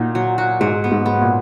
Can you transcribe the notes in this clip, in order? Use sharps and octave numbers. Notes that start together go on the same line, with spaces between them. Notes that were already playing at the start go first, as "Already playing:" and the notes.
Already playing: A#2 D#4 F#4
F#3
F#4
G#2 F#3
B3
G#2
B3
A#2